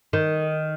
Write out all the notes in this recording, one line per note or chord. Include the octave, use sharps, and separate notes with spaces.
D#3